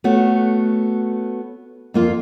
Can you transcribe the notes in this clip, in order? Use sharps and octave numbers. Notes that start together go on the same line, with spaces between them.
A3 B3 F#4 C#5
F2 A#3 F4